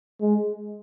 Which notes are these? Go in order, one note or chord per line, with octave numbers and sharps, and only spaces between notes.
G#3